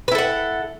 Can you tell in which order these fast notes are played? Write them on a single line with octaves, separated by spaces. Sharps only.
B4 E4 A4 F#5